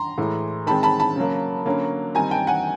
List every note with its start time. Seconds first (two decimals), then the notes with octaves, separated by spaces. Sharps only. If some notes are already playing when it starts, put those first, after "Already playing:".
Already playing: A#5 C6
0.18 A2 E3 G#3
0.67 D#3 G#3 C4 A5 B5
0.83 A5 B5
1.00 A5 B5
1.16 C#3 F#3 A#3
1.65 D3 F#3 A#3 C#4
2.15 D#3 G3 C4 D#4 G#5 A#5
2.31 G5 A5
2.47 F#5 G#5